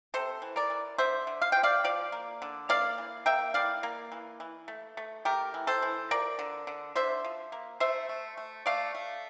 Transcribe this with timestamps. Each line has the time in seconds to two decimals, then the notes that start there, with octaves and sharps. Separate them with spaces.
0.14 C3 A4 C5
0.42 E3
0.56 A#4 D5
0.70 E3
0.98 D3 C5 E5
1.27 D3
1.42 F5
1.52 F3 G5
1.63 D5 F5
1.84 F3 D5 F5
2.12 A#3
2.42 D3
2.69 A#3 D5 F5
2.98 E3
3.26 A#3 E5 G5
3.54 E3 D5 F5
3.83 A#3
4.12 E3
4.40 E3
4.68 A3
4.97 A3
5.25 A3 G4 A#4
5.54 E3
5.67 A4 C5
5.82 E3
6.11 F3 A#4 D5
6.39 D3
6.67 D3
6.95 D3 C5 E5
7.24 F3
7.52 A#3
7.80 A3 C5 E5
8.09 A3
8.37 A3
8.66 A3 D5 F5
8.95 A3